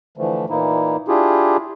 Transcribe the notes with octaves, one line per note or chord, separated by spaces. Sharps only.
D3 E3 F3 A3
A#2 E3 A#3 D#4 E4
D4 E4 F4 G4 G#4